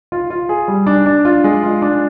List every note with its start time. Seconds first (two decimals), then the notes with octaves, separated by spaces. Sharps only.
0.12 F4
0.30 F4
0.49 G#4
0.68 G3
0.87 D4
1.06 D4
1.25 F4
1.44 G#3
1.63 F4
1.82 D4